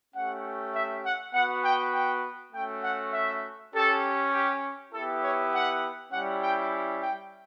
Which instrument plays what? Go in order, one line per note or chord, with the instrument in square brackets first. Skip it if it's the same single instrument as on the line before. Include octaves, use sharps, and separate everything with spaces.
[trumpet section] A3 C#4 G4 F#5
E5
F#5
B3 F#4 F#5
G5
G5
A3 C#4 F#4 G5
F#5
E5
C#4 G4 A4
G4
B3 E4 G4 A4
C#5
F#5
G3 C#4 E4 G4 F#5
G5
G5